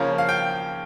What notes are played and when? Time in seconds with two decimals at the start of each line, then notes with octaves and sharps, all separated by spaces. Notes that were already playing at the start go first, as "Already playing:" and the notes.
Already playing: C#3 F3 A#3 C#4
0.18 F5
0.29 G5